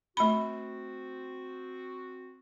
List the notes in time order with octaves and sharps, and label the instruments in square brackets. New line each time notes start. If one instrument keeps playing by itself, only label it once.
[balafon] A3 B5 [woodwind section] C4 F#4